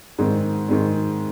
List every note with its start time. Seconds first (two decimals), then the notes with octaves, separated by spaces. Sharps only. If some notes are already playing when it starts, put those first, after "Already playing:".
0.18 G#2 D#3 G#3 C4
0.68 G#2 D#3 G#3 C4